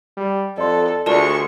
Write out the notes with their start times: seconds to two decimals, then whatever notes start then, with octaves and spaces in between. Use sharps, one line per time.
0.17 G3
0.58 F2 A4 D5 D#5 C6
1.06 D2 G#3 F4 A#4 D5 A5 C#6